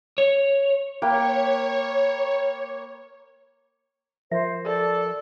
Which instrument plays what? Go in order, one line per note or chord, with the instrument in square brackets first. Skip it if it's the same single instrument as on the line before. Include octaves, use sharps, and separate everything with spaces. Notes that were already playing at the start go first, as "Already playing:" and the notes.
[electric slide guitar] C#5
[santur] A#3 B4 G5 [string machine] C#5
[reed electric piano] F3 A#4 [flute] C5 [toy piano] E5
[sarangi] A4 [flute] D5